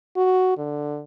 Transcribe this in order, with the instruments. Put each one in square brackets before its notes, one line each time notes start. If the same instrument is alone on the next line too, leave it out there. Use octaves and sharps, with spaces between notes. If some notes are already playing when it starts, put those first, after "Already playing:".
[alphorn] F#4
D3